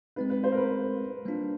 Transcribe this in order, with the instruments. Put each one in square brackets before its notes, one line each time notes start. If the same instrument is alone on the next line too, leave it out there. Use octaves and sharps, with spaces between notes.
[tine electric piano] G#3 C4 D#4 [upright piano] B4
[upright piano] B4
C5
A#4
B4
[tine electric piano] G3 A#3 D4 F4